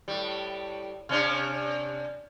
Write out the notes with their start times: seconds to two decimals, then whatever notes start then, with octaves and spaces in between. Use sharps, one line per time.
0.08 A2 G3
1.09 C3 C#4 D4